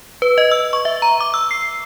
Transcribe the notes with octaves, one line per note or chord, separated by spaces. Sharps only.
B4
D#5
E6
C#6
E5
A#5
D6
E6
C7